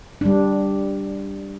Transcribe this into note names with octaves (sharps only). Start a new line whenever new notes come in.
G3 D4